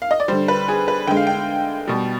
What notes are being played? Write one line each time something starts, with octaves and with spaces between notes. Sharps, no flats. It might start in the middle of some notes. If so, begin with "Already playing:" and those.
F5
D#5
D5
D3 G3 C5
B4
G#4
B4
D3 G#3 G5
F5
G5
B2 G3